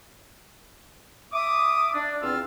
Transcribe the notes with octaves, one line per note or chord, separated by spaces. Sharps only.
E5 D6 D#6
D4
E2 C4 D4 F4 E6 F6